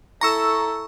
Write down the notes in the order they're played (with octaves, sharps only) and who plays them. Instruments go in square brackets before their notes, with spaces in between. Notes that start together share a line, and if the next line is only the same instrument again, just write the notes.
[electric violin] E4 A4 [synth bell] A#5 C#6 E6